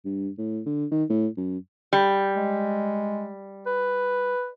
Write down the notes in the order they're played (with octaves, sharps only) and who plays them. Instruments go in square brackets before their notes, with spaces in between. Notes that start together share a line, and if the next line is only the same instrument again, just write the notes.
[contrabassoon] G2
A2
D3
D#3
A2
F#2
[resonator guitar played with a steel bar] G3
[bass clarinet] G#3
B4